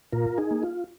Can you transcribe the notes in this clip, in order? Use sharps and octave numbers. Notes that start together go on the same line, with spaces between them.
A#2 F4 A#4
D#4 G#4
A#3
F4